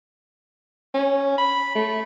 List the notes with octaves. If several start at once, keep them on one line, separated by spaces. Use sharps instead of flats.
C#4
B5
A3